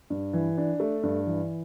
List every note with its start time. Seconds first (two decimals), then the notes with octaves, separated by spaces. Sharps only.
0.10 G2
0.33 E3
0.58 D4
0.80 A3
1.03 G2
1.27 E3